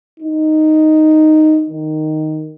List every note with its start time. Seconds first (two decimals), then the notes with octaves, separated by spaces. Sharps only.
0.20 D#4
1.70 D#3